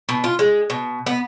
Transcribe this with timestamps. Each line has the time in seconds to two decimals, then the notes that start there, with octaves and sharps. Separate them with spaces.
0.09 B2
0.24 F4
0.39 G#3
0.70 B2
1.06 B3